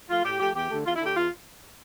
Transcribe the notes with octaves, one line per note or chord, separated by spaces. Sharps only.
F3 A3 F4
A2 G4
F3 A3 G4
E2 G4
D3 A3
E2 F4
E4
D3 A3 G4
E2 F4